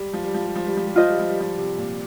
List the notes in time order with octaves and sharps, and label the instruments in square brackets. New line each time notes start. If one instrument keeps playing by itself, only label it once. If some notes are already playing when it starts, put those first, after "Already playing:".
Already playing: [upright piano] G3
F3
G3
F3
G3
F3
G3
F3
G3
[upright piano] F3 [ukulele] F4 C5 D#5
[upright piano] G3
F3
G3
F3
C3
A#2